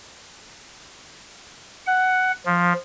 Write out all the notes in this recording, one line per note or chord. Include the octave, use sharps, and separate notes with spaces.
F#5
F3